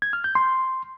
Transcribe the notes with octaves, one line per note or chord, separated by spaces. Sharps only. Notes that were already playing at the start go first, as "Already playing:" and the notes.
G#6
F6
G6
C6